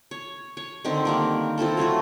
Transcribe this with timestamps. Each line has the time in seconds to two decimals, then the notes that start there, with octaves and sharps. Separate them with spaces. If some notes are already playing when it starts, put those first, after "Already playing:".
0.11 C#5
0.57 C#5
0.84 D3 D#3 C4
1.05 G3 A#3 A#4
1.58 C4 E4 F4 A4
1.77 F#3 A3 F4 F#4